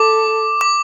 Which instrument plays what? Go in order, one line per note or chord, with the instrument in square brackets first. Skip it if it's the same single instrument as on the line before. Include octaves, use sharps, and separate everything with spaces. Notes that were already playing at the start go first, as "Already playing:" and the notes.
Already playing: [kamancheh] A4 [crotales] D6
[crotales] D6